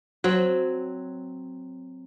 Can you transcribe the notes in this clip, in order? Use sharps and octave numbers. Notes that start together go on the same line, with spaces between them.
F#3 C4